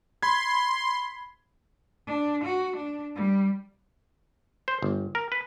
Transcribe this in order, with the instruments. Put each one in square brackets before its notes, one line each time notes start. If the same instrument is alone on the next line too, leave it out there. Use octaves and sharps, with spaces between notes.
[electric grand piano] B5 G#6 [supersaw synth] C6
[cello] D4
F#4
D4
G3
[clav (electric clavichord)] C5
G1
A#4
B4